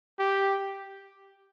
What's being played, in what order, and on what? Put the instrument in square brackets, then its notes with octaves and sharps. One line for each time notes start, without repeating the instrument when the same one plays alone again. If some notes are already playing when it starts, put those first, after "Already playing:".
[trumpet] G4